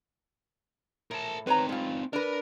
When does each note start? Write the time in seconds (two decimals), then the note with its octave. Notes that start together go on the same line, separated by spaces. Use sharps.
1.11 A2 A#4 A5
1.47 C4 D#4 B4 C#5 A#5
1.69 G2 F4
2.13 D4 A#4 B4